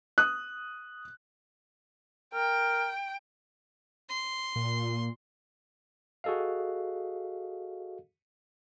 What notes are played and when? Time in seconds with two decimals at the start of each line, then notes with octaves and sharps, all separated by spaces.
0.18 D#6 F#6
2.34 A#4 G5
4.09 C6
4.56 A#2
6.24 F#4 G#4 A4 D#5 F5